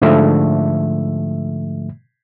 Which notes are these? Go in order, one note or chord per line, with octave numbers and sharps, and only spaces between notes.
G#2 D3 F3 A3 E5